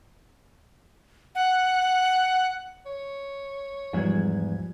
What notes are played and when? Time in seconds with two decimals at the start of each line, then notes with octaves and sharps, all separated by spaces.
1.35 F#5
2.86 C#5
3.93 E2 G#2 F3 G3 G#6